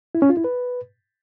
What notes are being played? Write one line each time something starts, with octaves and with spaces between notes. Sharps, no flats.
E4
C#4
F4
E4
B4